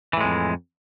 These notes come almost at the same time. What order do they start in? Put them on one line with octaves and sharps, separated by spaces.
E3 A2 G#3 F2